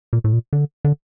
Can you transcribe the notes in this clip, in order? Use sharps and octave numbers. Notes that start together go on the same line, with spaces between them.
A#2
A2
A#2
D3
D3